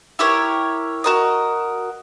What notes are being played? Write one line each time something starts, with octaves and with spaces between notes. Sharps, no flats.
E4 G4 A#4 C#5
F#4 A#4 D#5